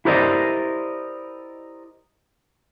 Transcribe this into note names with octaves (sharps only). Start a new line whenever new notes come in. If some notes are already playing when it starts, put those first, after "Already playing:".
E4 G4 A#4 C5 D5 D#5